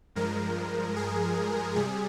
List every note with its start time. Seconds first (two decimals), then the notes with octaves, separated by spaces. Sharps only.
0.15 G2 F3 G#3 A#4
0.96 G#4
1.76 C3 G3 G#4